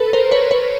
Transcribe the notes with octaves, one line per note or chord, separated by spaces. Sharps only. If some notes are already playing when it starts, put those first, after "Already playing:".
Already playing: A4 B4
A#4 C5
B4 C#5
B4 C#5